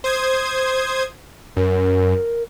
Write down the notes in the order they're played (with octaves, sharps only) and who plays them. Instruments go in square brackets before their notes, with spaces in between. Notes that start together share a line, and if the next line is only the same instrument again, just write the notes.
[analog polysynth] C5 D#6 G#6
[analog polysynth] F#2 [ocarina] A#4